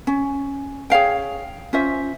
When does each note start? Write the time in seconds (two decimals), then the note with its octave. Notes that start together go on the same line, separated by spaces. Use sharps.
0.07 C#4
0.90 G#4 C#5 F5 G5
1.73 C#4 F4 C5 E5